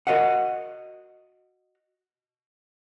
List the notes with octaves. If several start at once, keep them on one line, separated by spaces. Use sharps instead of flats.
F#4 A#4 D#5 F5 F#5